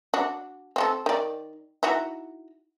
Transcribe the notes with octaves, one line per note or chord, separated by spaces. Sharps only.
D4 F#4
C4 F#4 A4
D#3 D5
D#4 E4 F#4